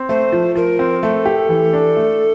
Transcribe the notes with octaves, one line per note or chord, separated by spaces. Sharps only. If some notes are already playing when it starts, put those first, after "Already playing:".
Already playing: C4
A3 C5
F3
F3 A#4
C4
A3 A4
G4
E3
D4
A3